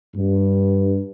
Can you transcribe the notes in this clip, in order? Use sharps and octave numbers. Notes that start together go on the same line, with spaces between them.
G2